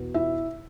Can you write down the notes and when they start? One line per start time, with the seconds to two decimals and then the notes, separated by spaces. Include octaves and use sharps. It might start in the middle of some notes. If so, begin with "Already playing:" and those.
Already playing: E2 B2 B3
0.14 E4 E5